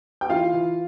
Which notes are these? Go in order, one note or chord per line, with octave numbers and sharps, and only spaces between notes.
G5
E3 F4 F5
E3